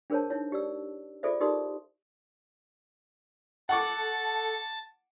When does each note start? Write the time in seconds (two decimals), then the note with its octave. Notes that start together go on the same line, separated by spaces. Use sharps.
0.10 D4 G#4 A#4 C5 C#5 A5
0.30 D#4 E4 C#5
0.52 G4 D5 E6
1.23 F4 G#4 A4 C5 D5 E5
1.40 D#4 G4 A#4 D5 C6 D#6
3.69 A4 F#5 A5 C#6 D6